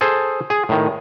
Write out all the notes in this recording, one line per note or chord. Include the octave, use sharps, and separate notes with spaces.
G#4 A4 C5
G#4
A2 D#3